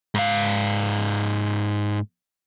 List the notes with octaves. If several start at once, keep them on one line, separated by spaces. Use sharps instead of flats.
G#2 F5